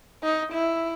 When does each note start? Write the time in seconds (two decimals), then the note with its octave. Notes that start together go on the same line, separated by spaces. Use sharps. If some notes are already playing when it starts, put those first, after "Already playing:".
0.23 D#4
0.52 E4